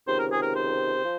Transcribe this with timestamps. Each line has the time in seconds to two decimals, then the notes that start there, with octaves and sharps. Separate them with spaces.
0.06 C#2 C3 D#3 C5
0.18 A#4
0.30 G#4
0.43 A#4
0.55 C5
1.02 F3